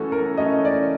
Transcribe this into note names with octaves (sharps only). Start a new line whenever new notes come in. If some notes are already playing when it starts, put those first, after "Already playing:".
Already playing: E3 A3 C#4 F#4 A4
A#4
E3 A3 C#4 F#4 D#5
D5